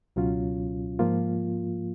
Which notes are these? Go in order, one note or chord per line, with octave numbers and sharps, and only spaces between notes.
C#2 B2 F#3 C#4 F4
G#2 F3 A#3 F4